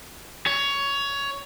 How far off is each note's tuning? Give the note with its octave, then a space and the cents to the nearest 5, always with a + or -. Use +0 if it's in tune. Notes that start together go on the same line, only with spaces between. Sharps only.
C#5 +15